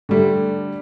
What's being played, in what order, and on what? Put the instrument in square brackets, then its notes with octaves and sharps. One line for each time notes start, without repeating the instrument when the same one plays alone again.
[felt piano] D3 G3 A3